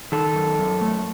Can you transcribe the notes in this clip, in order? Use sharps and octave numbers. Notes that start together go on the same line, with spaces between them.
D#3 A4
F#2
F#2
A3